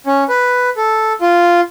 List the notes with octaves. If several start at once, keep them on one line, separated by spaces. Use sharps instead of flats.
C#4
B4
A4
F4